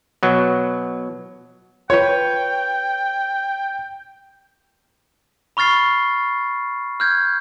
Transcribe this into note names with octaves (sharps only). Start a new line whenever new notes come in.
B2 F#3
F4 B4 C#5 G5
B5 C#6 F6 A6 C7
F6 G6 G#6